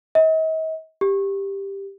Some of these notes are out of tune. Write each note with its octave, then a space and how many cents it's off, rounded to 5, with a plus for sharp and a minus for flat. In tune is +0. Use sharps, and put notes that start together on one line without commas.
D#5 +45
G4 +10